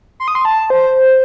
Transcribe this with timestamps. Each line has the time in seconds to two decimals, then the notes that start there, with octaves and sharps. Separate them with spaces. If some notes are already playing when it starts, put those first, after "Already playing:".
0.20 C6
0.28 D#6
0.35 C6
0.45 A5
0.70 C5